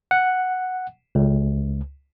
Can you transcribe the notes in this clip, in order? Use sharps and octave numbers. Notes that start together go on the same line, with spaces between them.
F#5
C#2